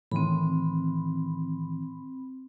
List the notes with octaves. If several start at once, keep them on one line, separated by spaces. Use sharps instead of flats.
A2 D#3 E3 C4 B5